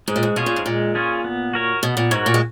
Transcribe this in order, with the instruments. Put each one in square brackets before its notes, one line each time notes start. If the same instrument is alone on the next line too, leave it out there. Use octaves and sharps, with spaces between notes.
[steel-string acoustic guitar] G#2 [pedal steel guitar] G#3
[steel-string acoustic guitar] A#2
G#2
[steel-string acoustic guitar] B2 [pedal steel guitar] C#4 F4 G#4 C#5
[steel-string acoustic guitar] A#2
G#2
[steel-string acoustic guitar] A#2 [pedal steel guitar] G#3
[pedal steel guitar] C#4 F4 G#4 C#5
B3
F#4 A#4 C#5
[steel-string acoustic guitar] B2 [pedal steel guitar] B3
[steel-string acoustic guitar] A#2
[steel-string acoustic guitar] G#2 [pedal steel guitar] F#4 A#4 C#5
[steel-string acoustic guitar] A#2
G#3